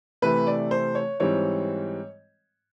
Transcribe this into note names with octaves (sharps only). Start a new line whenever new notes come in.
C3 E3 A3 B4
D5
C5
C#5
G#2 E3 G3 C4 C#5